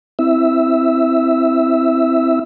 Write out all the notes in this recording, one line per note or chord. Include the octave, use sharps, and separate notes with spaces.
C4 E4 E5 E6